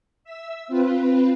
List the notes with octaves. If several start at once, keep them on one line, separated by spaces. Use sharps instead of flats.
E5 E6
C4 F4 B4